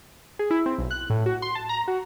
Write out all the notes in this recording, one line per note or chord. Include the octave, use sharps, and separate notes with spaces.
G#4
E4
C4
B1
F#6
A2
F#4
C6
A5
A#5
F#4